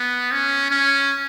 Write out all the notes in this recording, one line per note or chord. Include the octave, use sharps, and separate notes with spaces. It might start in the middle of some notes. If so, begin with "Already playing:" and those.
Already playing: B3
C#4
C#4